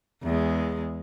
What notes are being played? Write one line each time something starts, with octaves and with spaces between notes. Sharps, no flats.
E2 G#3